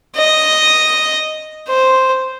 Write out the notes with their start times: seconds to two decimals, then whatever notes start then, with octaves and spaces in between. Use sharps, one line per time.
0.16 D#5
1.68 C5